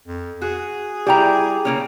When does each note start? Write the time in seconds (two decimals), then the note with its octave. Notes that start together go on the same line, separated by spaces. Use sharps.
0.07 F2
0.42 F#4 G#4
1.07 G3 E4 G4 G5 A#5
1.65 C#3 A#3 C#4